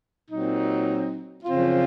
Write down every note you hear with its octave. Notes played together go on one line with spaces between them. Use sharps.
A#2 F#3 C4 D#4
F#2 C#3 F3 C4 F4